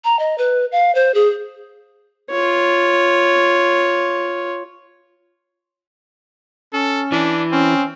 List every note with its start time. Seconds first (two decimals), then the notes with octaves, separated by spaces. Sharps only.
0.04 A#5
0.19 D#5
0.38 B4
0.72 F5
0.95 C5
1.14 G#4
2.31 F4 C#5
6.73 C#4 A4
7.12 E3 D4
7.52 C4 C#4